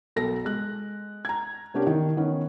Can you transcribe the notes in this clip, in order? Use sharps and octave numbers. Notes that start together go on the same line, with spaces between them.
B1 A4 A#6
G#3 F#6
A#5 G#6
C3 B3 C#4 D4 G4 A#4
D#3
D#3 B3 C#4